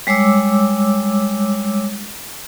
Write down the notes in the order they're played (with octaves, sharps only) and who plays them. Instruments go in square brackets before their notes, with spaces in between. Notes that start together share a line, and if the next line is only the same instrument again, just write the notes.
[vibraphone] G3 G#3 C#5 D6 E6